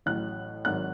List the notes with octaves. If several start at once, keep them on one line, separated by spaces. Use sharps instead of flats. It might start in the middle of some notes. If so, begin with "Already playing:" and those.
A1 A2 F#3 F#6
G#1 G#2 D#3 F#3 F#6